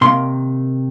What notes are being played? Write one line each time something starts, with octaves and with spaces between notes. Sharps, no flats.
C3 D#3 A#3 C6